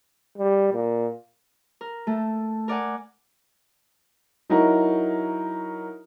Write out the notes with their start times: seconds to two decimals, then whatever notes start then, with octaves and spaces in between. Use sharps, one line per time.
0.38 G3
0.73 A#2
1.81 A#4
2.07 A3 A4
2.68 A#4 D5 F#5 G#5
4.50 F#3 D#4 E4 F#4 A#4